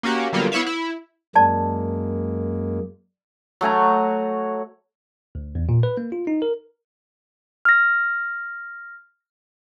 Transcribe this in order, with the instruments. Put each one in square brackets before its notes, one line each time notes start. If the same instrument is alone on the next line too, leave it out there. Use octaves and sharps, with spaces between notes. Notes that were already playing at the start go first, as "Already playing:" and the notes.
[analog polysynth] A#3 C#4 F#4 G4
D3 F#3 G3 A#3 B3 F4
B3 E4 C#5 E5 F5
E4
[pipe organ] F#2 G#3 A#3 [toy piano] D5 A5
[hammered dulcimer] F#3 A3 G#5 A#5
[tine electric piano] D2
E2
A#2
B4
A#3
F4
D#4
A#4
[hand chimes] F6 A#6